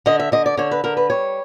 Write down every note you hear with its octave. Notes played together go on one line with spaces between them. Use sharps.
D3 D#5
E5
D3 D#5
D5
D3 C#5
B4
D3 A#4
B4
G3 C#5